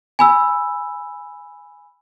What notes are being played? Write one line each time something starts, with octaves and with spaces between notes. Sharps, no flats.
G#5 B5 E6